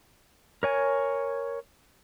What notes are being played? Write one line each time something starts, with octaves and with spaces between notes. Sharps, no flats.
A#4 C#5 G#5